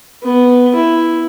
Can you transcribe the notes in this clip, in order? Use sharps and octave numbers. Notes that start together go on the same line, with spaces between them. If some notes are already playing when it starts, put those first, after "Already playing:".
B3
E4